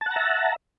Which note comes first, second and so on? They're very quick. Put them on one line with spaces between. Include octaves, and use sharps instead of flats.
A5 F#5 A#5 E5